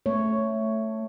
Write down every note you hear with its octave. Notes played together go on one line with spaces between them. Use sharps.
A3 C#5